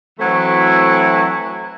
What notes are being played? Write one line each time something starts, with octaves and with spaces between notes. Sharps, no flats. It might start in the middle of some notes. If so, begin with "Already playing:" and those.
E3 F#3 A3 C4 E4 F#4